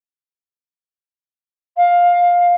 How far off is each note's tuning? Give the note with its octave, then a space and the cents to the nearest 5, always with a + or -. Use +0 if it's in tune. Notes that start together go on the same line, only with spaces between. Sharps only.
F5 +15